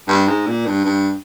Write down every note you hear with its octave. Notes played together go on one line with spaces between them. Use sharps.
G2
G#2
A#2
G2
G2